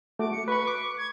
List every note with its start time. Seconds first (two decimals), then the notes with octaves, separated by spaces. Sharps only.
0.19 A3 F#4 D6
0.32 C#7
0.48 B4 B5 C#6
0.67 D6
0.97 G#6